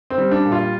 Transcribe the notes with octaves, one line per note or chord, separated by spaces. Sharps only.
C4
G3
D4
A#2
F4